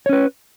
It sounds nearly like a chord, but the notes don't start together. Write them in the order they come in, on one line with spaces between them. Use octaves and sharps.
C#5 C#4 B4